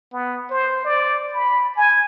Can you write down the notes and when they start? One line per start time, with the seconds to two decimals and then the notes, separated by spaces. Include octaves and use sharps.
0.13 B3
0.50 C5
0.85 D5
1.33 B5
1.77 G#5